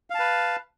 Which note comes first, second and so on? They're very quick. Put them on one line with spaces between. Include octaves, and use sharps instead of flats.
F5 A5 B4